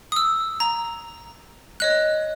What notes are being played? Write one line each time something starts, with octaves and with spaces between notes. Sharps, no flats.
D#6 E6
A#5
C#5 D#5 F#6